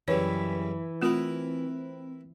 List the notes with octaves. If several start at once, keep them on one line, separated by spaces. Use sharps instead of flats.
F#2 C#3 E3 G3 C#5 B6
A3 C4 E4 F4 A#4 B4